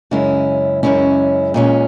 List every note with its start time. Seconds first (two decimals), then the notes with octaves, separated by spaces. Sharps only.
0.11 F#2 C#3 G#3 C#4 E4
0.83 F#2 C#3 G#3 C#4 E4
1.54 A#2 G#3 C#4